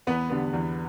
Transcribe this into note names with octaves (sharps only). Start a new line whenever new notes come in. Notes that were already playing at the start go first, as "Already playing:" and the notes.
E2 B3 B4
D3 G3 B3
E2